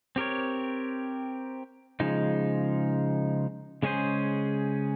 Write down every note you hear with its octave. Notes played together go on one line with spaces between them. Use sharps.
C4 G4 A#4 C#5
C#3 F3 G#3 D#4
C#3 G#3 C#4 G#4 C5